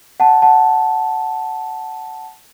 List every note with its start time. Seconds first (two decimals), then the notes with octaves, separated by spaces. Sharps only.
0.20 F#5 A5
0.42 F#5 A5